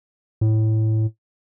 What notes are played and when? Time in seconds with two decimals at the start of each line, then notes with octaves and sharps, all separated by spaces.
0.41 A2